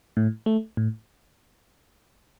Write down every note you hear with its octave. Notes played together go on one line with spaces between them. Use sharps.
A2
A3
A2